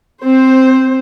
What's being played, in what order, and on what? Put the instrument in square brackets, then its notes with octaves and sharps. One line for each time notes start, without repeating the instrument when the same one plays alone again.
[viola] C4 C5